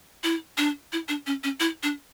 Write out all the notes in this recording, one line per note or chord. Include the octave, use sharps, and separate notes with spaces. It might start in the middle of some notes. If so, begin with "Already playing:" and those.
E4
D4
E4
D4
C#4
C#4
E4
D4